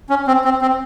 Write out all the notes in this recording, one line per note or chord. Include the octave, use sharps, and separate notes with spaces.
C#4
C4
C4
C4